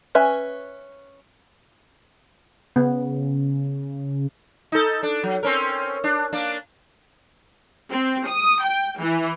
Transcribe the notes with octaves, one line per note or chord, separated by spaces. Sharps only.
C#4 B4 E5 G#5
C#3 B3
D#4 A4
D4
F#3
C4 C#4 A#4
D4
A#3 D4
C4
D#6
G5
E3